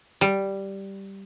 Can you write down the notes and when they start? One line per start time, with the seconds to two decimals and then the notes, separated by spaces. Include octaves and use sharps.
0.21 G3